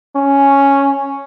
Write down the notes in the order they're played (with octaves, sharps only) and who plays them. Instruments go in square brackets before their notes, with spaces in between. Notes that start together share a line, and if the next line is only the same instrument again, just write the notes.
[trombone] C#4